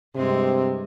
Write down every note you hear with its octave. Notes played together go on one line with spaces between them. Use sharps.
G2 C3 G#3 C4